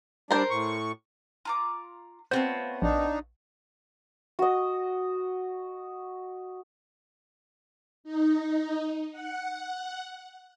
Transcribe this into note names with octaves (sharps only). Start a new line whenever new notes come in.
G3 D4 A#4 C5
A2 C#6
F4 A#5 D6
A3 B3 C4 F4 C5 C#5
A#1 D4 D#4
F#4 D#5
D#4
F#5